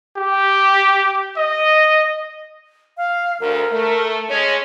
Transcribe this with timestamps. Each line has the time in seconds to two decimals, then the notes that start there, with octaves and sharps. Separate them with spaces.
0.17 G4
1.37 D#5
2.97 F5
3.41 D2 A#4
3.72 A3
4.29 G#3 C#4 C#5